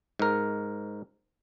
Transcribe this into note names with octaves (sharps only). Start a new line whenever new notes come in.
G#2 A#4